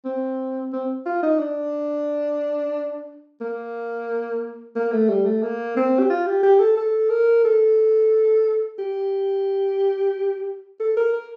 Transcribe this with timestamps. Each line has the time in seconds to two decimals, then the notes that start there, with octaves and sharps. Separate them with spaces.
0.05 C4
0.73 C4
1.06 F4
1.23 D#4
1.39 D4
3.41 A#3
4.76 A#3
4.92 A3
5.09 G3
5.26 A3
5.43 A#3
5.76 C4
5.99 G4
6.10 F4
6.27 G4
6.43 G4
6.60 A4
6.77 A4
7.10 A#4
7.45 A4
8.78 G4
10.80 A4
10.97 A#4
11.13 A#4